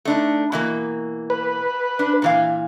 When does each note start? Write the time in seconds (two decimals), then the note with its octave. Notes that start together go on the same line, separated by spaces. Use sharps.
0.05 A3 D4 D#4
0.52 B2 E3 A#3
1.30 B4
1.99 D4
2.22 A#2 E3 F5